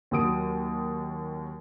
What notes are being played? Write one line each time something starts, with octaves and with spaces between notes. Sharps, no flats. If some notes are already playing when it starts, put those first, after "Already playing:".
D#2 F#3 D#6 D7